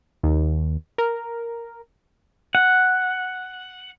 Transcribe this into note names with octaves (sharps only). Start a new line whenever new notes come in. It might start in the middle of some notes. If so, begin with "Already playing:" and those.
D#2
A#4
F#5